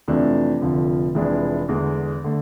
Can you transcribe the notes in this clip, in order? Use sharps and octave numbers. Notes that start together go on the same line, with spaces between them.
F2 C3 E3 A3 D4
F1 F2 D3 F3
F1 F2 E3 G#3 D4
E2 D3 G#3
D3 A3